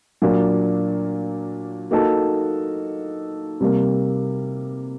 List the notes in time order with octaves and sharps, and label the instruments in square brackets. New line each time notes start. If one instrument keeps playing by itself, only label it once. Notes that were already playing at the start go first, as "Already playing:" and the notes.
[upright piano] A#2 F#3 A#3 D4 F#4
A#3 D#4 F#4 A4
C3 G3 A#3